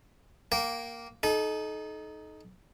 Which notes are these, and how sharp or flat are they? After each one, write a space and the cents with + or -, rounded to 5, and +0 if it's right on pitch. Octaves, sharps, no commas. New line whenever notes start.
A#3 +0 G5 -25
D#4 +0 A4 -35